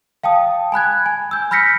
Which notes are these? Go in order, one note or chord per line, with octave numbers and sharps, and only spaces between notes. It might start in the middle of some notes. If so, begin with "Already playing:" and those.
F5 G5 A5 D#6
G#5 B5 F#6 G#6
G#5
E6 G6
B5 F6 G6 A#6 B6 C#7